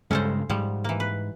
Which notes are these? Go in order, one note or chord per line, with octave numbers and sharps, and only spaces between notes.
G2 C#3 G#3 C#4 A4 C5
G#2 F3 G3
E3 A#3
B4